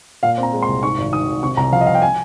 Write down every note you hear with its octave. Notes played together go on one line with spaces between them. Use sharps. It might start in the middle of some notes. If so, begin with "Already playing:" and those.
A#2 F5
C4
A#5
G#3
C6
C2
G#2 C#6
G#1
D#3 D#6
G#1
C3 C#6
C2 A#5
F3 F5
D#5
C2 F5
G5
G#5